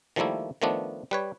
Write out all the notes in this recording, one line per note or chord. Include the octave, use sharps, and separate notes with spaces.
D#3 F3 G3 A3 A#3 E4
D#3 F3 A3 B3 D4
G3 B4 C#5